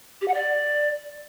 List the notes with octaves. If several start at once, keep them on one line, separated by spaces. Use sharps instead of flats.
G4
F#5
D5